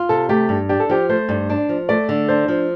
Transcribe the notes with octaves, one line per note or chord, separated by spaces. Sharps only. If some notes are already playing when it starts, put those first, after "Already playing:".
Already playing: F4
C3 A4
A3 G4
G2
D4 G4
A4
F3 G4
A3 C5
G2
D4
F3
A3 D5
D3
D4 C5
F3